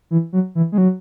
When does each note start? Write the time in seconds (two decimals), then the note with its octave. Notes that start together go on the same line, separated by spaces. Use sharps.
0.11 E3
0.33 F#3
0.55 E3
0.72 G#3
0.78 F#3